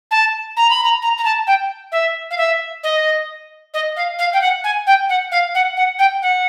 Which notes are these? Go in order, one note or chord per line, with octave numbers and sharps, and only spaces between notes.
A5
A#5
B5
A#5
A#5
A#5
A5
G5
E5
F5
E5
D#5
D#5
F5
F5
G5
F#5
G#5
G5
F#5
F5
F#5
F#5
G5
F#5